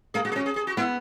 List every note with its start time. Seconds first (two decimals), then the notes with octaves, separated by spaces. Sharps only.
0.14 A#3 G#4
0.25 B3 F#4
0.32 G#4
0.35 C#4 F#4
0.46 G#4
0.56 G#4
0.67 F#4
0.77 B3 E4